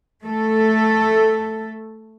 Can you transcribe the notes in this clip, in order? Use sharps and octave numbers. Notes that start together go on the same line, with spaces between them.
A3 A4